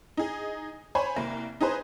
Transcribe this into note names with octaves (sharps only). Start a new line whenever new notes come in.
D#4 G#4
C5 C#5 G#5 B5
C2 A#3
D#4 G#4 B4 C5